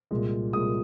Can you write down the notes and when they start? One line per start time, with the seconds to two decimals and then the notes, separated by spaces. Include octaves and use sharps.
0.11 C2 A#2 G#3
0.53 C2 A#2 G#3 D#6